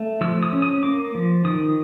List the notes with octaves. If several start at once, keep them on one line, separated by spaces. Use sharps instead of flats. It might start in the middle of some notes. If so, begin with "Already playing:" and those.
Already playing: A3
F3 E6
D#6
C#4
D#6
A#3 D6
F3
D#3 D#6